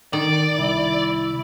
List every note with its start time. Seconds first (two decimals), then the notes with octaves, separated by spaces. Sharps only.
0.13 D#3 D5
0.59 C2 E4